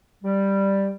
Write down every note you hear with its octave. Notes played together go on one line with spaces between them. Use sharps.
G3